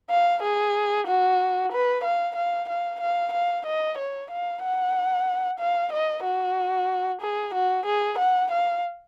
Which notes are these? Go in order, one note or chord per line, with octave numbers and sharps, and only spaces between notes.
F5
G#4
F#4
B4
F5
F5
F5
F5
F5
D#5
C#5
F5
F#5
F5
D#5
F#4
G#4
F#4
G#4
F#5
F5